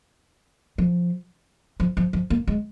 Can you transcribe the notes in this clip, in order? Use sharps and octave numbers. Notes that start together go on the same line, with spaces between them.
F3
F3
F3
F3
A#3
G#3